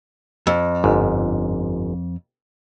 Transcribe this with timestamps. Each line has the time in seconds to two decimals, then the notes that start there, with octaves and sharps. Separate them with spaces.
0.47 F2
0.84 G1 G#2